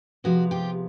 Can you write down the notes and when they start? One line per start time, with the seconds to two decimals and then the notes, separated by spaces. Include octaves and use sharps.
0.24 C3 F3 G#3 B3 F#4
0.51 F4 G4